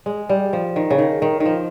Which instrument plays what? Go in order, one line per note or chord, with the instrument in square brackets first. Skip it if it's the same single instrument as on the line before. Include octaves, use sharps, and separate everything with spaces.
[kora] G#3
G3
F3
D#3
C#3
D#3
D#3
D#3
F3